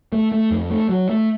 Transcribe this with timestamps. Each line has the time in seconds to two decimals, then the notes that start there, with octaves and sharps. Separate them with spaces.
0.13 A3
0.32 A3
0.51 F2
0.70 A3
0.89 F#3
1.09 A3